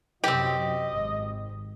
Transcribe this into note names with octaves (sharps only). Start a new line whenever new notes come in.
F#2 C3 F#3 C4 G4 D#5
G#1